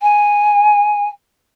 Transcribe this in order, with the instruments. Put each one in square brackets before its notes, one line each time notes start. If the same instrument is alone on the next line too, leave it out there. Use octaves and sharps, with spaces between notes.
[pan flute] G#5